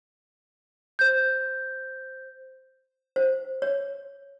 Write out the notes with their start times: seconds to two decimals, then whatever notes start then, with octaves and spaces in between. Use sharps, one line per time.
0.99 C5 G6
3.16 C5
3.62 C#5